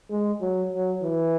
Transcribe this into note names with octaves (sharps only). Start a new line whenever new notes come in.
G#3
F#3
F#3
E3